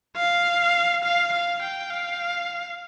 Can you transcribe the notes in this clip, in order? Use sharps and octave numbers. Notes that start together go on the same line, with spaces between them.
F5
F5
F5
G5
F5